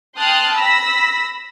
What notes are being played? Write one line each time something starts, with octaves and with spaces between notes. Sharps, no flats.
G5 A5 C6 D#6 F6 F#6
B5 E6 A#6 B6